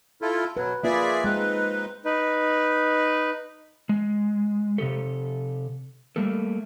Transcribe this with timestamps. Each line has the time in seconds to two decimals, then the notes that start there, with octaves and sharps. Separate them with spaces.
0.22 E4 F4 A4
0.57 B2 F#3 B4
0.84 A#3 F4 G#4 B4 D5 E5
1.24 G#3 C4 D#4 B4
2.05 D#4 B4
3.89 G#3
4.78 C3 D#3 G4 A4
6.16 G3 A3 A#3 A4